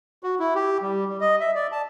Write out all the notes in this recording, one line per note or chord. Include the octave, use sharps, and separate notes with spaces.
F#4
E4
G4
G3
G3
D#5
E5
D5
A5